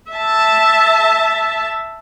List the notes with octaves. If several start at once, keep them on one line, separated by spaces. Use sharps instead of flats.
E5 A5